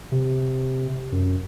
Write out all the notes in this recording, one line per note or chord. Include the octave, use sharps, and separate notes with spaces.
C3
F#2